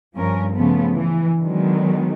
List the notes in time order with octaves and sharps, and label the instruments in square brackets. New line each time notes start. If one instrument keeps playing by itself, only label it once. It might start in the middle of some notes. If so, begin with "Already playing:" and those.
[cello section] G2 F3 C#4 A#4
C#3 F3 A3 B3
E3
D3 D#3 F#3 G#3 B3